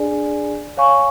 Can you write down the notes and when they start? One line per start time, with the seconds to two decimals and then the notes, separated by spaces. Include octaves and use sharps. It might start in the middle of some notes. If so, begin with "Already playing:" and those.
Already playing: D4 G#4 D5 G#5
0.77 C#5 F5 G#5 C#6